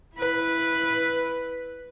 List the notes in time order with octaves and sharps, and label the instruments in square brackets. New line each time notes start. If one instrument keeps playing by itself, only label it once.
[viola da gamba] E4 B4